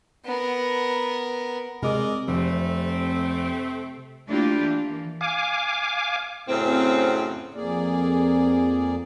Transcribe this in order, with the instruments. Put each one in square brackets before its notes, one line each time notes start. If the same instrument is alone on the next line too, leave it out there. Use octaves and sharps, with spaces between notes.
[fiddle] B3 A#4
[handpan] C3 [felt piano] G#3 [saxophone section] A#4 D5 D#5
[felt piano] F1 [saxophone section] A3 C4
[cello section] A3 A#3 D4 E4 F4 G4
E3 A#3
[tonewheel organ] F5 G#5 D6
[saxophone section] F#2 A2 C#3 C4
[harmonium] F2 A#3 G#4 D5